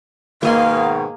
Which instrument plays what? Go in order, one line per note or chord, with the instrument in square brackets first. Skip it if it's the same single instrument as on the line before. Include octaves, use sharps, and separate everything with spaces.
[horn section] G#2 B2 D#3 [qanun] A#3 G#4 C6 [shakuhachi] F5